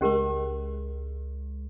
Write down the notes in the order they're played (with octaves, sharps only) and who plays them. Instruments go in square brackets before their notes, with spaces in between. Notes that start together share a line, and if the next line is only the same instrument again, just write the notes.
[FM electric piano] C#2 G#3 [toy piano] C#4 G4 A#4